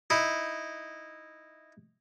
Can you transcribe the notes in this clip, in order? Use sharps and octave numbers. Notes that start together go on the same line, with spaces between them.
D#4 E4